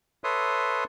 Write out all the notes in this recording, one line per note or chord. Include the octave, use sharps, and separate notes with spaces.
A4 B4 C#5 E5 C6 D#6